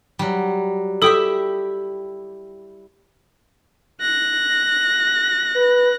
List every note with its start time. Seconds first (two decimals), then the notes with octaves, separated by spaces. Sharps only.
0.19 F#3 G3
1.02 E4 G4 A4 E5 D#6 D7
4.01 F#6 A#6
5.56 B4